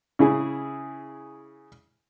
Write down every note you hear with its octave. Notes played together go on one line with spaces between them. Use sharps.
C#3 E4 G#4